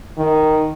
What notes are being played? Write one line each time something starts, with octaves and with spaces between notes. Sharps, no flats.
D#3